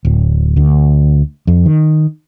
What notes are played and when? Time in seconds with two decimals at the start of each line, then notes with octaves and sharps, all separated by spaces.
0.05 D1
0.56 D2
1.47 F2
1.66 D#3